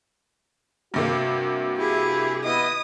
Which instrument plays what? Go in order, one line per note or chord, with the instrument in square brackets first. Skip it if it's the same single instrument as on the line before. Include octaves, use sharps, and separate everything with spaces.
[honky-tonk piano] G2 C3 A#3 [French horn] F#4
[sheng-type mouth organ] E4 [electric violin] G4 G#4
[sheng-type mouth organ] B3 E4 D#5 [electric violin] D#6